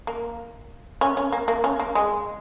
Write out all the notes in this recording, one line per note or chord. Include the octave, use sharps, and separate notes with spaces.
A#3
C#4
C#4
A#3
A#3
C#4
A#3
G#3